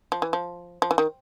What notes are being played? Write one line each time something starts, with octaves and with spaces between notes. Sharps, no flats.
F3
E3
F3
F3
E3
D#3